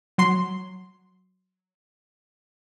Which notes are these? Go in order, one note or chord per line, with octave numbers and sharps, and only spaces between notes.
F#3 C6 C7